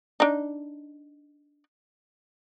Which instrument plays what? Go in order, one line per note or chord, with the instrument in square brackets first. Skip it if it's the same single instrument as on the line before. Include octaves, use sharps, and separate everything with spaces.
[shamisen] D4 D#4